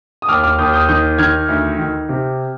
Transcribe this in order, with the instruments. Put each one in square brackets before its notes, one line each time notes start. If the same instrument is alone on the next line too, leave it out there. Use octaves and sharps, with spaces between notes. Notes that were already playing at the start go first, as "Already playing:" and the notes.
[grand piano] D#6
D#2 D6 F6
D6 F6
D#2 D#6 G6
D#6 G6
D#3 D#6 G6
D#3 F6 G#6
D2
D#3
C3